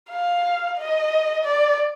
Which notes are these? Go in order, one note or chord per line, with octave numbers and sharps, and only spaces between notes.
F5
D#5
D5